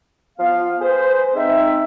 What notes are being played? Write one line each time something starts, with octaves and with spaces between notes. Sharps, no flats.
F3 B3 F5
G#4 B4 C5
G#3 C4 D#4 E5